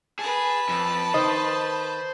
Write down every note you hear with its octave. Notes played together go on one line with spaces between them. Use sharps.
G#4 B4 A5
F2
D#3 C5 D#5